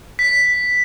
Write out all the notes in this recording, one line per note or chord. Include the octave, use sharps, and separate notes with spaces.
B6